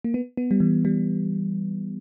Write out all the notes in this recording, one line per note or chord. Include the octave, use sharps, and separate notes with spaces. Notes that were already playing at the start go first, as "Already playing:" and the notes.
A#3
B3
B3
G3
E3
G3